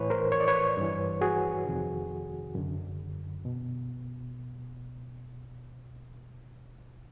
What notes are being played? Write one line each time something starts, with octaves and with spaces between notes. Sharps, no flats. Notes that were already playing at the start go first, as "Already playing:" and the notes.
Already playing: A2 E3 B4 C#5
A#4 C5
C#5
D5
B4 C#5
G2 E3
F#4 G#4
F2 C3 D#3
F#2 D3
B2